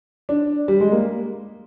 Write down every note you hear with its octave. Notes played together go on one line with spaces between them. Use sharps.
D4
G3
G#3
A#3